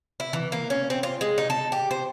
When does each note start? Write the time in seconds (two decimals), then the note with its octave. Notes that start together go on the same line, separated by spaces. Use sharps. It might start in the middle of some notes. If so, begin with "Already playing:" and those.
0.20 E4
0.33 E3
0.52 A#3
0.70 C#4
0.90 C4
1.03 F4
1.21 G#3
1.38 D#4
1.50 A4
1.72 G4
1.91 C5